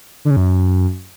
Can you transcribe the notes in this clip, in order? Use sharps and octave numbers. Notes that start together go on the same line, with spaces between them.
D3
C#3
F#2